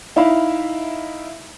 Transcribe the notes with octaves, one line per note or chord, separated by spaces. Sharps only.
D#4 E4 E5 F5 B5